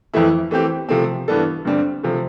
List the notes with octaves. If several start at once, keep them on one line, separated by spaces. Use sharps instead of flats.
F2 E3 A3 E4
E3 A3 C4 G4
C3 F3 A3 C4
G2 E3 B3 D4 A4
G2 D3 G3 C4
C3 F3 A3